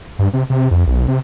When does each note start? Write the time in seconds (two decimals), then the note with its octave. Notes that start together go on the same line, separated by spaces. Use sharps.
0.19 G2
0.33 C3
0.50 C3
0.71 F2
0.87 B1
1.08 C3